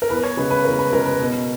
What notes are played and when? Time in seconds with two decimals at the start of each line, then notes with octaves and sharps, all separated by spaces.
0.02 A#4
0.09 E2 B4
0.24 C#5
0.37 C#3 G#3 B4
0.51 B4
0.64 E2 A#4
0.79 B4
0.92 C#3 G#3 A#4
1.06 B4
1.19 B2